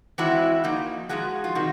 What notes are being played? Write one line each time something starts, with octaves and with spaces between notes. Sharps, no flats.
E3 G#3 C4 E4 F#4
F3 A#3 D#4
A2 F3 G#3 F#4 G#4
F4
C3 D#3 G3 F#4